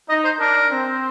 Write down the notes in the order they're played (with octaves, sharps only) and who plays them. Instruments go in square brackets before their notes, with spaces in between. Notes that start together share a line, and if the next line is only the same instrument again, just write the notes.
[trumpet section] D#4 [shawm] D#5
[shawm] C5
[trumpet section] D4 [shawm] A#4
[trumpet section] C4